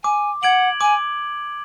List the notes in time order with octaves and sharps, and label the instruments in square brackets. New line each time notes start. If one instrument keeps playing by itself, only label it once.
[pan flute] G#5 [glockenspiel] D6
[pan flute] F#5 [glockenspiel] G#6 D7 F#7
[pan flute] G#5 [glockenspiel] D6